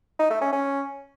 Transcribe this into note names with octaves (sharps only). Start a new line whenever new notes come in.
D#4
A3
C#4
C#4